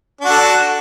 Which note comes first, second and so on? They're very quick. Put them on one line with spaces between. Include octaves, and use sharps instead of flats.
D4 F#4 A4